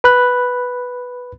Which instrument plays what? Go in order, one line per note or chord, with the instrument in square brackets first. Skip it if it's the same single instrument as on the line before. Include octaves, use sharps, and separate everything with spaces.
[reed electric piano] B4 B5 F#6